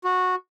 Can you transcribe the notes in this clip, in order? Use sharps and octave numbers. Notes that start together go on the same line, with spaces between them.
F#4